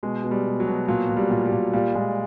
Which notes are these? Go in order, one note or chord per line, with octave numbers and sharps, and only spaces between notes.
B2 G#3
B2
G3
B2
F#3
B2
A#2 F#3
A#2
G3
A#2
G3
A#2
A#2 G3
A#2 G#3